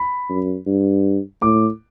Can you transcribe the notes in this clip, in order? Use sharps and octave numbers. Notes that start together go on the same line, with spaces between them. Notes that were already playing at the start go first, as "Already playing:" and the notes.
Already playing: B5
F#2
G2
A2 D6